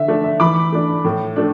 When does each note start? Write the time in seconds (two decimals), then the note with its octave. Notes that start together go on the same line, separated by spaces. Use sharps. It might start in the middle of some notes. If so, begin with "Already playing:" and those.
Already playing: D3 E5
0.08 A3 D4
0.24 E5
0.40 E3 B5 D6
0.72 A3 D4
1.05 A2
1.36 A3 D4